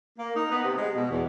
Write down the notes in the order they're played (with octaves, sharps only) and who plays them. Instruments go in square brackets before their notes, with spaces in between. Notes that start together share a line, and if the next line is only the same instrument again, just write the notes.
[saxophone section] A#3
D#4
B3
C3
G#3
B2
E2